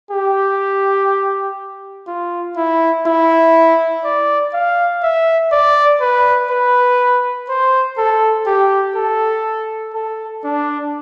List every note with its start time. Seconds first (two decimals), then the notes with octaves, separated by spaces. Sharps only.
0.11 G4
2.07 F4
2.57 E4
3.06 E4
4.04 D5
4.54 F5
5.03 E5
5.52 D5
6.01 B4
6.50 B4
7.49 C5
7.98 A4
8.47 G4
8.96 A4
9.94 A4
10.44 D4